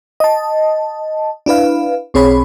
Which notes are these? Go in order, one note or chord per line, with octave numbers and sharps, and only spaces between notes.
D#5 A5
D4 E4 B4 F5
B1 C4 G#4 C#5 B5